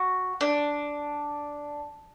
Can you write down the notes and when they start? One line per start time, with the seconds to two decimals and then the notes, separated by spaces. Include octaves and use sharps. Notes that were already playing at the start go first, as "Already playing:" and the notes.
Already playing: F#4
0.41 D4